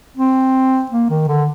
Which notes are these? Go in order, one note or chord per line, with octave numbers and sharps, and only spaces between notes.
C4
A#3
D#3
D3